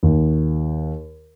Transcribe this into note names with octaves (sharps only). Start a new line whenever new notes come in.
D#2